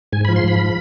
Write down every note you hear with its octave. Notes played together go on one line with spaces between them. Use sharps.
G#2 G#5
B5
F3
C6
G#2 B5
F3